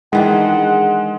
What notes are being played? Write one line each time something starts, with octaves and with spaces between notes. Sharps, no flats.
D#3 E3 G#3 D4 F#5